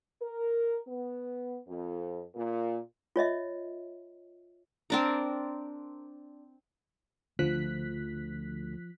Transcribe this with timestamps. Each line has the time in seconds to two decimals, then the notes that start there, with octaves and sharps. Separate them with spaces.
0.22 A#4
0.88 B3
1.68 F2
2.35 A#2
3.16 F4 C#5 D#5 E5
4.90 C4 D4 A#4
7.39 D2 D3 F3 A3 F#6 B6